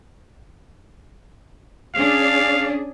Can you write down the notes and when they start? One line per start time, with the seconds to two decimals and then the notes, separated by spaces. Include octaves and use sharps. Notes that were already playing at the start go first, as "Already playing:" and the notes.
1.95 C#4 D4 G#4 F5